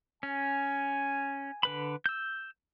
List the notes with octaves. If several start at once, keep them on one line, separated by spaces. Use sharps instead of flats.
C#4 G#5
D3 B4 B5
E6 G6